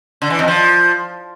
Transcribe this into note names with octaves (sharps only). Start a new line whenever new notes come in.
D3
E3
F2
F3